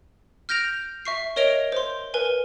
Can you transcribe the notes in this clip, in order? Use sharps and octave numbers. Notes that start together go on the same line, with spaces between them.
F6 G6 A#6 D7 F7
E5 C#6 C7
A#4 C#5 D#5 D7 F7 G7
C5 C6
A#4 B4 G#5